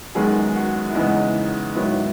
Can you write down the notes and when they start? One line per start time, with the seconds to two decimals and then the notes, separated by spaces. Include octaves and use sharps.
0.15 F#2 D#3 G#3 B3 G#4
0.56 F#4
0.90 E4
0.95 E2 C#3 E3 G#3 B3 D#4
1.75 G#2 D#3 F#3 B3 E4